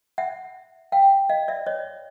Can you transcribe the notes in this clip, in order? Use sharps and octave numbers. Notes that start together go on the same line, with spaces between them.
E5 F#5
F5 G5
D#5 F5
D5 E5
C#5 D#5